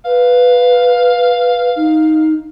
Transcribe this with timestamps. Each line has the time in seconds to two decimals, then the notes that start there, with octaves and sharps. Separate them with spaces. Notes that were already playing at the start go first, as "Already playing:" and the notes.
0.05 B4 F5
1.76 D#4